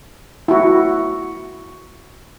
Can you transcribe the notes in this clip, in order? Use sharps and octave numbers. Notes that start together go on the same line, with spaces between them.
E4 F#4